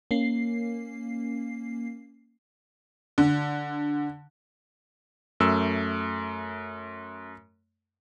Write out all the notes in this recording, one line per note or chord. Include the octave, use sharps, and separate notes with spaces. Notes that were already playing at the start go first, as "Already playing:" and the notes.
A#3 C#4 C7
D3
F#2 A3 E6